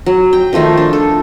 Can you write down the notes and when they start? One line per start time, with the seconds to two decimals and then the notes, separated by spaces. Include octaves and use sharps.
0.06 F#3
0.33 G5
0.53 D#3 F3 A3 D#4
0.77 D4
0.93 A4